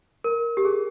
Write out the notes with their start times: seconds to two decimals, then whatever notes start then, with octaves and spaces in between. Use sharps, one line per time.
0.24 A#4
0.57 G4
0.65 G#4